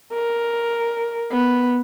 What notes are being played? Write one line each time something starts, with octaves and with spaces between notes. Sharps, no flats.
A#4
B3